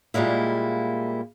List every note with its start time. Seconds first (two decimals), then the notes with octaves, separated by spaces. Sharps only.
0.14 A#2 G3 G#3 A#3 E4